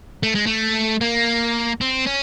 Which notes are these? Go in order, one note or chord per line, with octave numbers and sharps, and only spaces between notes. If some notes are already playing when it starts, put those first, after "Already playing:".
A3
G#3
A3
A#3
C4
C#4